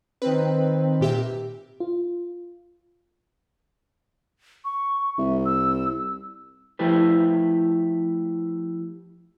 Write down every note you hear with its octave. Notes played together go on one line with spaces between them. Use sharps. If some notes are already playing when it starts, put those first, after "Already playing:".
D#3 C4 B4
A#2 G4 E5
F4
C#6
C2 E5
E6
F3 A3 E4 G4 B4